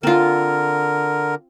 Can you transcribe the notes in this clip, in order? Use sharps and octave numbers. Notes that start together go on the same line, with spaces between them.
D3 C4 F4 A#4